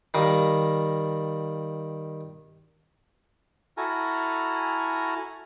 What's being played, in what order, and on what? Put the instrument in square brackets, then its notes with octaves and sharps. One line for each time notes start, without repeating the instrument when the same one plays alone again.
[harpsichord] D#3 G3 F5 A#5
[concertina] E4 F#4 A4 G#5 A#5 F6